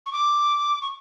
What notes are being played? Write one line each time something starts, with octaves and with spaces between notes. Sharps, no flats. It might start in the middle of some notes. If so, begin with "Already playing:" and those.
C#6
D6
C#6